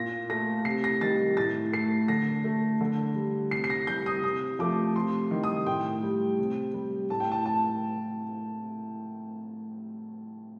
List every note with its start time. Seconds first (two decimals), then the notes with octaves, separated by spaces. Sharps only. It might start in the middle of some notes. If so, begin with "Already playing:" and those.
Already playing: A#2 A#6
0.30 A3 A#6
0.65 C3 C7
0.84 A#6
1.01 D#3 G3 A6
1.37 A2 A6
1.72 A3 C7
2.08 D3 A#6
2.44 A3
2.81 D3
3.16 G3
3.51 C3 C7
3.64 C7
3.70 A#6
3.87 G3 G6
4.06 D#6
4.23 C3 D#6
4.59 F3 A3 D6
4.96 C3 C6
5.31 D#3 G3
5.43 D#6
5.66 A2 G5
6.03 G3
6.38 C3
6.74 G3
7.10 A2 A5
7.20 G5
7.32 A5
7.46 A5